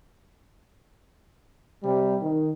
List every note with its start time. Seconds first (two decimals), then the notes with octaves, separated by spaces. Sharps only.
1.83 C3 G3
2.22 D#3